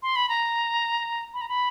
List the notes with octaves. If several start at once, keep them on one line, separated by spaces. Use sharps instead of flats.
C6
B5
A#5
B5
A#5
B5